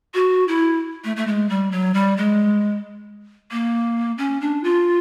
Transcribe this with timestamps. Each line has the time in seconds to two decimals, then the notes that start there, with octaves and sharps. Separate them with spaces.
0.14 F#4
0.48 E4
1.04 A3
1.17 A3
1.27 G#3
1.49 G3
1.72 F#3
1.94 G3
2.17 G#3
3.51 A#3
4.18 C#4
4.41 D4
4.64 F4